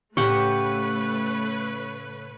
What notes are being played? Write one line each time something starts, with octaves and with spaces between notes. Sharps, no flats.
A2 C#3 A3 G4 B4 C#5 F#5 C#6